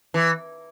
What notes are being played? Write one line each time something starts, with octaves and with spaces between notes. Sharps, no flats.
E3